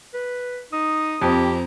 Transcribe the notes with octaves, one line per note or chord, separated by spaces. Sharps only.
B4
D#4 D#6
F2 C4 G4 A#5